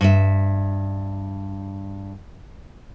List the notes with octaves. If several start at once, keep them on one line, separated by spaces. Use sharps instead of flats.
G2 E5